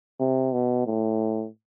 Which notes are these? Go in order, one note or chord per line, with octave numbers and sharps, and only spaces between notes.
C3
B2
A2